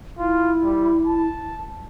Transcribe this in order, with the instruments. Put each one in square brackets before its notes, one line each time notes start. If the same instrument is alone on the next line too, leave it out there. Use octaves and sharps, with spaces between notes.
[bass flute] E4 [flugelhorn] F4
[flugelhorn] G3
A5